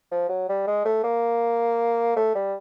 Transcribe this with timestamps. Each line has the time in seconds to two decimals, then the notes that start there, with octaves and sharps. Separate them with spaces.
0.11 F3
0.29 F#3
0.49 G3
0.67 G#3
0.85 A3
1.04 A#3
2.16 A3
2.35 G3